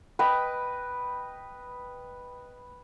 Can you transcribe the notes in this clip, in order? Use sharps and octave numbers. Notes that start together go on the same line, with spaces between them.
B4 D#5 G5 B5